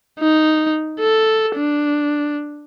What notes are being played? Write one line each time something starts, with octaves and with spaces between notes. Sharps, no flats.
D#4
A4
D4